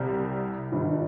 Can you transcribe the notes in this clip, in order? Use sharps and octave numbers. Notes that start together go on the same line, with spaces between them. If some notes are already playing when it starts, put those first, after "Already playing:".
Already playing: C2 C3 G3
G#1 G2 F3